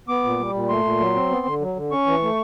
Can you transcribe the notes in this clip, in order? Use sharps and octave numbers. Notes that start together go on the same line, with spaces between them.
B3 D6
A#2
G3
A#2
A3 C6
A#2
F#3
C4
B3
D3
F#3
D3
C#4 C#6
E3
A3